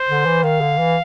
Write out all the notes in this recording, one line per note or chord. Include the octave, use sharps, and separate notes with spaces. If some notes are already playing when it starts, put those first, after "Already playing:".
Already playing: C5
D3
E3
D#3 F5
D3
E3